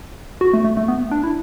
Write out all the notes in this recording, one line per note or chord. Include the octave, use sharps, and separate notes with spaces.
F#4
A3
A3
A3
B3
D4
E4